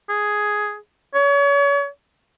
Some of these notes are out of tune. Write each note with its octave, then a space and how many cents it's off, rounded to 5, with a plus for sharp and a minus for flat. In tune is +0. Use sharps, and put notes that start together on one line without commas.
G#4 +5
C#5 +35